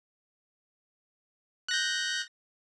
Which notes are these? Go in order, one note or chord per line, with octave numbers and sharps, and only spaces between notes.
F#6 G6 A#6